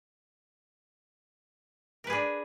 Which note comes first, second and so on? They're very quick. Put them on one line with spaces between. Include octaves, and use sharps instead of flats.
A#4 B4 G#4 D4